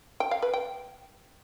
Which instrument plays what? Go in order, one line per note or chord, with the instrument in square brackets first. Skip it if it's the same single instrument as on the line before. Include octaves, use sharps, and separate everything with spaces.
[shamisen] G5
F5
B4
G5